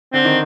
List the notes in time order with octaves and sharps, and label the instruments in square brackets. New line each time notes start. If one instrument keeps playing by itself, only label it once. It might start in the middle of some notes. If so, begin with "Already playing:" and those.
[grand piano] D3 [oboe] C4
[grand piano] D#3